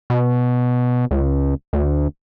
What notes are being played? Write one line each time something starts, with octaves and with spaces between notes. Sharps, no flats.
B2
C#2
D2